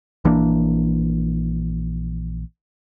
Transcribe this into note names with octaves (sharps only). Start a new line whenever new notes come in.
A#1 E3 A#3 D4